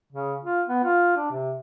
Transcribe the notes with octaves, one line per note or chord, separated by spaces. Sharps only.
C#3
F4
B3
F4
D4
C3